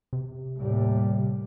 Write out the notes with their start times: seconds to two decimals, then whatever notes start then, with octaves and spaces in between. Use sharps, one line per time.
0.13 C3
0.59 D#2 A2 G3